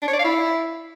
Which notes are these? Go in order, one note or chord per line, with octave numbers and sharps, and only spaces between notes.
D4
C#5
D5
F5
E4